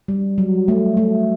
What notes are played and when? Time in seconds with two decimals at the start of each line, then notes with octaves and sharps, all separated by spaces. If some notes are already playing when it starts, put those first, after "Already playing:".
0.08 G3
0.38 F#3
0.68 A3
0.97 A3